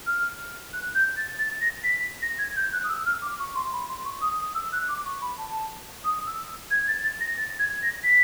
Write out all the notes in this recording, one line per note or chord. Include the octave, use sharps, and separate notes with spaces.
F6
F#6
G6
A6
A6
A#6
B6
A#6
G#6
G6
F#6
D#6
E6
F6
D6
C#6
C6
B5
C6
C#6
D#6
D#6
E6
F#6
D6
C#6
B5
A5
D#6
E6
G#6
A6
A6
A#6
A6
G#6
A#6
B6